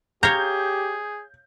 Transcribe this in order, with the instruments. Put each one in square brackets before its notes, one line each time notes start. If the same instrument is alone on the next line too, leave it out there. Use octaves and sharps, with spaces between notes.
[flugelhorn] G4 [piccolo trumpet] G#4 [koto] C#5 F5 A#5 [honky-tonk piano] G6